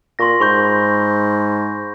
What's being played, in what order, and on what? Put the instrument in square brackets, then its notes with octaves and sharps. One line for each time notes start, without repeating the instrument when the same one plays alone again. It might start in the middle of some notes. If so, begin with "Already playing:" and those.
[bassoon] A#2 [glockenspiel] C6 C#6 A#6
[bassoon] G#2 [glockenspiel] B5 C#6 G6